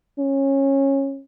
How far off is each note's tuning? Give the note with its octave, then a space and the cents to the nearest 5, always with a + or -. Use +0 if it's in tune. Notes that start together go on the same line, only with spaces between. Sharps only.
C#4 -20